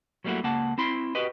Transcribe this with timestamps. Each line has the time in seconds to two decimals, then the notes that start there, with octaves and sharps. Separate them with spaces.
0.24 F#3 G3 A3 A#3 E4 F#4
0.44 C#2 A#3 F#5 A5
0.78 C4 E4 B5 C6
1.15 F#4 G4 B4 D#5